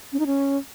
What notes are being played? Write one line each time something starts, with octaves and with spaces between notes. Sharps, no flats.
C#4
D#4
C#4